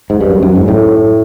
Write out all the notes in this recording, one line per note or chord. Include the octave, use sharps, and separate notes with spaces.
G#2
G2
F#2
F#2
G#2
A2